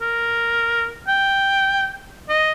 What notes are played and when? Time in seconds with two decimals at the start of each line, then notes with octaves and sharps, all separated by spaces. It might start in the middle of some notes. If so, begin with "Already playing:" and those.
0.01 A#4
1.08 G5
2.29 D#5